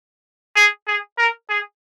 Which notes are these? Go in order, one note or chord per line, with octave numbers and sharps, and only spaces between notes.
G#4
G#4
A#4
G#4